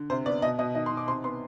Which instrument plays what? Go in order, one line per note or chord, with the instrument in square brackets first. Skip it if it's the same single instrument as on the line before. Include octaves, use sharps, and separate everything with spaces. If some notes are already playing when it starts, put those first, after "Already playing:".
Already playing: [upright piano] D3
C3 C5
B3 D5
B2 D#5
B2 D#5
D#3 D#5
C6
D#3
D6
C3 C6
B3 C6